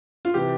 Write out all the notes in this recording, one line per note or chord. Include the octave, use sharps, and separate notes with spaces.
F4
C3 E3 G4